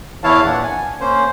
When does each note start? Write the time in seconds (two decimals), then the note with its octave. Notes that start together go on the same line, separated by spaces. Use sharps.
0.24 E2 E3 E4 C#5 F5 A5
0.45 A#2 D4 F#5
0.63 G#5
1.00 A#3 C#4 C5